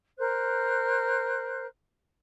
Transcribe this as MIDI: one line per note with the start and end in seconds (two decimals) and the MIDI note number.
0.18 1.66 70
0.18 1.66 72
0.18 1.66 90